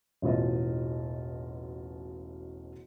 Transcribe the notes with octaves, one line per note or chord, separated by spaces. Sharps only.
E1 A1 B2 F4 D#5